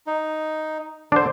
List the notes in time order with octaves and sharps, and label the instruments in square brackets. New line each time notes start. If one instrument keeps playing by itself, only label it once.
[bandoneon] D#4
[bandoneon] D3 [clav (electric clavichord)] D4 C5